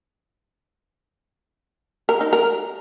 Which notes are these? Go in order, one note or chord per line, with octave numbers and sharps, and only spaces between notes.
A#4
D#4
A#4